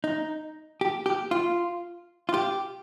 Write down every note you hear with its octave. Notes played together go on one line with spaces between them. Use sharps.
D#4
G4
G4
F4
F4
G4